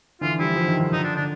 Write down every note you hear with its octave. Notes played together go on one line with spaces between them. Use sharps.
D3 E3 F4
F3 G3 E4
F3 G3
D#3
D3
D3 D#4
D4
D4
D3